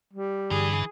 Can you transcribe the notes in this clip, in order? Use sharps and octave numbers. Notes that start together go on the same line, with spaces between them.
G3
G2 D3 E3 G#4